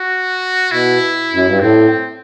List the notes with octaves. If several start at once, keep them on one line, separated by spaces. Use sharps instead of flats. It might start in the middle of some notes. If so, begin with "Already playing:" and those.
Already playing: F#4
B2 E4
F#2
G2
A2 C4